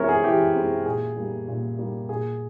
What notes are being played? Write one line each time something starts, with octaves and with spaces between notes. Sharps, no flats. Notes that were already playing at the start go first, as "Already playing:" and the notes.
Already playing: E3 G#3 C4 A#4 C#5 E5
G#4
E3 G4
G#3 C4
A#2 G#4
G3 A#3
A#2
G3 A#3
A#2 G#4